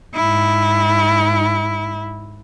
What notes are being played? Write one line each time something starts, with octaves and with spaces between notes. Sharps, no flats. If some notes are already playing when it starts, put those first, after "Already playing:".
G#2 E4